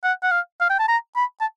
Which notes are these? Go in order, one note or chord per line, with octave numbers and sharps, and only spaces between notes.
F#5
F#5
F5
F5
G5
A5
A#5
B5
A5